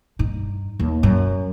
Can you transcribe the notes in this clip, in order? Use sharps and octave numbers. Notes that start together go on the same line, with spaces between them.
G2 D#4
D#2
F#2